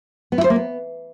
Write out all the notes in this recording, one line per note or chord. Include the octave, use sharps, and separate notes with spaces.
B3
E4
C5
A#3
B3